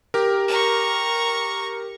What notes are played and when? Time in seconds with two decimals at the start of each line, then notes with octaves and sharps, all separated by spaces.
0.14 G4 A#4
0.48 A#5 C#6